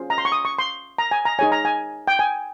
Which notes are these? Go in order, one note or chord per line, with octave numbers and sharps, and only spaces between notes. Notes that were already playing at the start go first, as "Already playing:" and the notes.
Already playing: C#4 F4 G#4 C5
A#5
C6
C#6
D#6
C#6
C6
A#5
G#5
A#5
D#4 G#4 C#5 G#5
A#5
G#5
G5
G#5